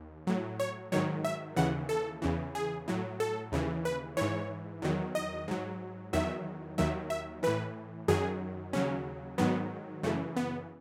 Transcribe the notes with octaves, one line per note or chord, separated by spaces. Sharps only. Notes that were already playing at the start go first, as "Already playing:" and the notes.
Already playing: D#2
A2 F#3
C#5
G#2 D#3 F#3 C#5
E5
D#2 C#3 E3 F#5
A4
E2 C#3 E3
G#4
A2 F#3
A4
D#2 C#3 E3
B4
G#2 E3 C#5
E2 D#3 F#3
D#5
G#2 F#3
E2 D#3 F#3 E5
D#2 D#3 F#3 E5
E5
A2 E3 B4
F#2 D#3 F#3 G#4
D#2 C#3 F#3 C#4
G#2 D#3 F#3 B3
F#2 C#3 E3 A3
B3